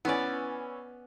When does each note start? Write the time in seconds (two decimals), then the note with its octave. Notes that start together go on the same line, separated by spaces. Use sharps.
0.05 E3 B3 C#4 D5